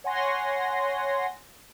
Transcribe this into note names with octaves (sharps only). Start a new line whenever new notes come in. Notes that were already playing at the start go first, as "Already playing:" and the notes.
C#5 F#5 G#5 C6 A#6